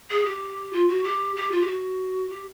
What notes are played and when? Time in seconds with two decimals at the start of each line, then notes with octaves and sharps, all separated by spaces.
0.10 G#4
0.25 G4
0.73 F4
0.88 F#4
1.04 G4
1.36 G4
1.51 F4
1.61 G4
1.67 F#4
2.30 G4